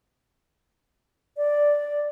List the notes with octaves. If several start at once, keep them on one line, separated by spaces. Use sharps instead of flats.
D5